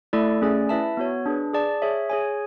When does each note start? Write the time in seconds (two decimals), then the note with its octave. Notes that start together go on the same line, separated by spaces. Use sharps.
0.13 A3 E4 A4 D5
0.41 A3 C#4 G#4 D5 G#5
0.69 E4 B4 E5 A5
0.97 B3 F#4 C#5
1.26 D4 G#4 B4
1.53 G#4 D5 A5
1.82 G#4 C#5 E5
2.10 G#4 C#5 G#5